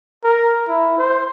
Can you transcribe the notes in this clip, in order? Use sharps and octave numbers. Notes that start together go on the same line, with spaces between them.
A#4
E4
C5